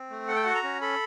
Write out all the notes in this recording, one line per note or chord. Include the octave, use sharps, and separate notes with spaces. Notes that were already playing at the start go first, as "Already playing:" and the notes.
Already playing: C4
A3
A4 F#5
G5
F#4 F#5
A#5
C#4
A4 B5